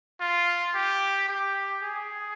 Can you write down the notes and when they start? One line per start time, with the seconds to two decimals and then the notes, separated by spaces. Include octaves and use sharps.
0.21 F4
0.74 G4
1.28 G4
1.83 G#4